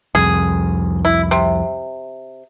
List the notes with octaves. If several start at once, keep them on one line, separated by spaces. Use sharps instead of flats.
C2 F2 G#4
E4
C3